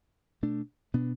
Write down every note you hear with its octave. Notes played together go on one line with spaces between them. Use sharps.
B2 A3 D4
B2 B3 D4